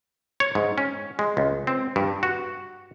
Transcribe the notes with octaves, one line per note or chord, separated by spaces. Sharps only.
C#5
G#2
C#4
G#3
C#2
C4
G2
F#4